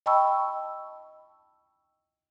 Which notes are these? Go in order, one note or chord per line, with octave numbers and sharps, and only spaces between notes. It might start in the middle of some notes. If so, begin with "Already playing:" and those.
D#5 G5 A5 B5 C#6 E6